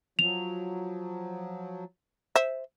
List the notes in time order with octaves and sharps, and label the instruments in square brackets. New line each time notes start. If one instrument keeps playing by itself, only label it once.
[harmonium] F3 F#3 [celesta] F7
[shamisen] C5 E5